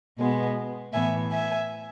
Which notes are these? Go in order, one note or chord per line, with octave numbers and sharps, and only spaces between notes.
B2 G#3 B3
A2 E3 B3 E5 G#5
E5 G#5